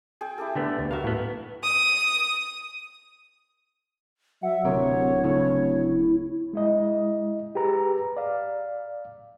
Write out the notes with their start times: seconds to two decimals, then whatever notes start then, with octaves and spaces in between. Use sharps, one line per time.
0.21 G#4 G5
0.38 E4 G4 A4
0.55 D3 A3 B3
0.79 D2
0.91 F#4 A#4 E5 F5
1.04 A2 B3
1.63 D#6
4.43 F#3 E5 F#5
4.64 D1 D2 C3 A#4 C#5
5.23 C#3 A3 E4
6.53 G#3 E4 D#5
7.55 G4 G#4 B4 A#5
8.17 D5 F5